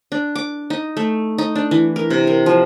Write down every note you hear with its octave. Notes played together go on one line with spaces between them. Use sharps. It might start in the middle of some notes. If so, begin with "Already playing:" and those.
D4
D6
D#4
A3
D#4
D4
E3
A#4
C3
A#4
F3